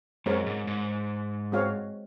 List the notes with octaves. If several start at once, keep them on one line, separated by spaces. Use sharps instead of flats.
F#2 G#3 C4 F#4 A#4 C#5
G#2
G#2
G#3 C4 F#4 C#5 F5